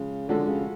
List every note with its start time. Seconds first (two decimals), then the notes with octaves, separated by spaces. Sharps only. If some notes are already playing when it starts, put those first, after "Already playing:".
Already playing: C#3 F3 G#3
0.28 D3 F3 G#3 C#4 F#4 A4
0.48 C#3